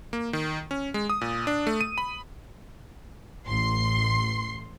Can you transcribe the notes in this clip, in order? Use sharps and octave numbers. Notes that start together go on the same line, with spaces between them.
A#3
D#3
C#4
G#3
D#6
A#2
D4
A3
D#7
B5
A1 C6 C7